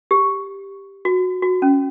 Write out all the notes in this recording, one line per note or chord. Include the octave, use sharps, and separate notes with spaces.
G4
F#4
F#4
C#4